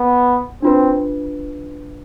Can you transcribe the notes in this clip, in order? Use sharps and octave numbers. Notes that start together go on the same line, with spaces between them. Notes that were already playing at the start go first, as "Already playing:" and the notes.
Already playing: B3
C4 D4 F4 B4